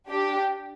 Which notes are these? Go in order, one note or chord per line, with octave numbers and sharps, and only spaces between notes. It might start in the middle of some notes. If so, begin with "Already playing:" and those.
D4 G4